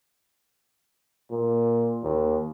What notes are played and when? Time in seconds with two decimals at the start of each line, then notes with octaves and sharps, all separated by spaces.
1.31 A#2
2.03 D#2